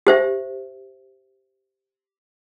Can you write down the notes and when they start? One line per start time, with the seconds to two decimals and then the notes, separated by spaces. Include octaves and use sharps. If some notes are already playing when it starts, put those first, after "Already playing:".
0.07 G4 C5 E5